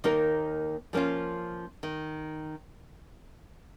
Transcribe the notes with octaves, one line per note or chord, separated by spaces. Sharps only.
D#2 D#3 A#3 D#4 A#4
F3 A#3 C#4 F4
D#3